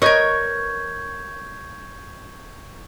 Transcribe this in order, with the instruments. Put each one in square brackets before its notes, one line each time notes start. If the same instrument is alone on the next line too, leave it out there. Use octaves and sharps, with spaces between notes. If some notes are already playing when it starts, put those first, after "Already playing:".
[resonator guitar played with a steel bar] A#4 C#5 [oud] B4 D#5 [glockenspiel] C#6 G6 G#6